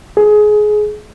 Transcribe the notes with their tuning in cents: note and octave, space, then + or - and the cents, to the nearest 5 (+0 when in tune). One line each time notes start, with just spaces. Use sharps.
G#4 +20